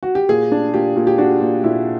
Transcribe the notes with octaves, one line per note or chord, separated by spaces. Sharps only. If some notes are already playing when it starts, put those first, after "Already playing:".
F#4
G4
A#2 G#4
D4
A#2 G4
A#2
G4
D4 F#4
A#2
A#2 E4